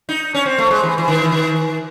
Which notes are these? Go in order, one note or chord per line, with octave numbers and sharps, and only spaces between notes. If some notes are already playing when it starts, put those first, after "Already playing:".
D#4
C#4
C4
A3
G#3
E3
E3
D#3
E3
D#3